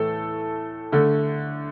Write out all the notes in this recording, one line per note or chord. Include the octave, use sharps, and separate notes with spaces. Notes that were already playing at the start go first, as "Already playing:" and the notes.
Already playing: A2 E3 A3 A4
D3 A3